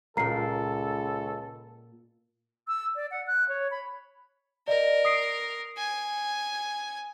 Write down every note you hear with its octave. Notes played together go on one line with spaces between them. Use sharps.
C#2 A#2 A#3 A4 A#5 C7
E6
D5
F#5
F#6
C#5
B5
A#4 D5 D#5
D#6 C7 D7
G#5